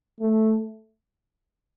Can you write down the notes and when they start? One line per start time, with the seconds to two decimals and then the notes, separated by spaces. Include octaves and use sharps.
0.20 A3